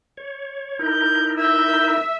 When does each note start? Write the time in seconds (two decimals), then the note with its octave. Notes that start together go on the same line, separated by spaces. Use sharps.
0.17 C#5
0.79 D#4 E4 A#4 G6
1.38 E5 G6